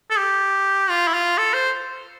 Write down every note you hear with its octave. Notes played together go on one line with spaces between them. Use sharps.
A4
G4
F4
E4
F4
A4
C5